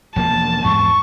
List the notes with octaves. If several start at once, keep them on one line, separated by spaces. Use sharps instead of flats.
E1 F3 A#3 A5
E2 G#2 C#6